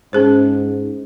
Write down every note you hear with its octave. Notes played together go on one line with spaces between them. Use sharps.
G#2 C#4 G#4 C5